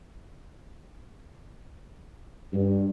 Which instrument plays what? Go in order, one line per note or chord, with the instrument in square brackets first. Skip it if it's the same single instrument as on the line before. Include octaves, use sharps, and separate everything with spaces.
[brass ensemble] G2